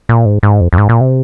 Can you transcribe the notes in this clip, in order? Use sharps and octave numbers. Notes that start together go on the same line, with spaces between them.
A#2
G#2
G#2
F2
F2
G#2
A#2
C3